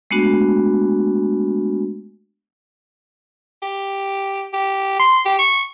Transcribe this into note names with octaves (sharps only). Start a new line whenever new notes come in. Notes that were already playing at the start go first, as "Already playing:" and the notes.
G#3 A3 B3 D4 F#4
G4
G4
C6
G4
C#6